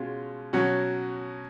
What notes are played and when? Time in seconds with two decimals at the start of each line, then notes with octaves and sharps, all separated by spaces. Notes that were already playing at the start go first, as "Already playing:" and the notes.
Already playing: B2 G#3 C#4 F4
0.53 B2 F#3 C#4 F#4